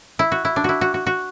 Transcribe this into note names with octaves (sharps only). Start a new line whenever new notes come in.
E4
F#4
E4
D4
E4 F#4
F#4
F#4
F#4